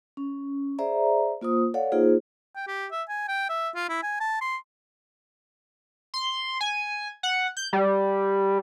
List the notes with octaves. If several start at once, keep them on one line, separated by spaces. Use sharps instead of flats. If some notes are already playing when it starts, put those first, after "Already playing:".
C#4
G#4 C5 D5 E5 A#5
A#3 F4 C5 D#6
A4 C#5 D5 F5 F#5
A#3 D#4 F4 G#4 C5
G5
G4
E5
G#5
G5
E5
F4
E4
G#5
A5
C6
C6
G#5
F#5
G6
G3